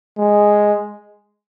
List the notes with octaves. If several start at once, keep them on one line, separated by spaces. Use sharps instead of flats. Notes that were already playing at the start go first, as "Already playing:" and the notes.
G#3